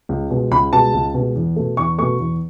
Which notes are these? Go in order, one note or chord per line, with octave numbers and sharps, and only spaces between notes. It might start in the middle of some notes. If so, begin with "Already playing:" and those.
C#2
B2 G#3
C#2 B5
B2 G#3 A5
C#2
B2 G#3
E2
B2 A3
E2 C#6
B2 A3 C#6
E2